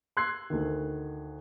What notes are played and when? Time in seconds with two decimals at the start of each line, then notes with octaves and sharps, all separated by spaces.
0.17 C6 E6 F#6 G#6 C7
0.50 D2 D#3